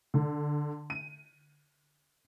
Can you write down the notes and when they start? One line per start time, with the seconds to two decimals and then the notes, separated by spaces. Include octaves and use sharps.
0.14 D3
0.90 D#7